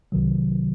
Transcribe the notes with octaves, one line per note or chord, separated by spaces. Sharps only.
C2 C3 D#3 F#3